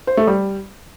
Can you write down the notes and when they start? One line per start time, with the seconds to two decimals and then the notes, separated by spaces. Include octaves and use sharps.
0.07 C5
0.17 A3
0.27 G3